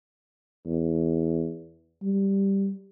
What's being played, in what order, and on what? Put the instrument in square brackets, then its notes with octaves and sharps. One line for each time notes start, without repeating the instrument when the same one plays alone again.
[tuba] E2
G3